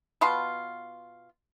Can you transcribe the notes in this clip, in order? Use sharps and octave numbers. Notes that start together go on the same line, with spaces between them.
B2 B3 F4 C6